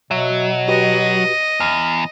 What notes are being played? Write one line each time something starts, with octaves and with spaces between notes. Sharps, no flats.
B2 F#3 E5
F#4 G4 B4 D#5
E2 F6